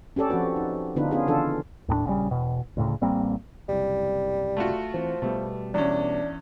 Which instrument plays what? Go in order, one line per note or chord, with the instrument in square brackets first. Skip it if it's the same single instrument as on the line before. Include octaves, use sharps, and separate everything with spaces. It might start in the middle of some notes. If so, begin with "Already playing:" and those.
[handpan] C#4 G4 A4 D5
F3 C4 C#4 F#4 B4
D#4
D3 B3 D4 D#4 F4 B4
B3 C#4 D4 F4 G#4
C#3 E3 D4 F4 A4
[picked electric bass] D#2 A2 G#3 D4
A#1 C#3 G3
E1 B2
D2 A2 C#3
A1 G3 A#3 C4
[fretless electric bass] F#1 C2 [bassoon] G3
[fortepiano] A3 F4 F#4
[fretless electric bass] E3 B3 C4 [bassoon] F3
[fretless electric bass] B2 G3 B3 [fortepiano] A3
[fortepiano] E2 C#4 [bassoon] D4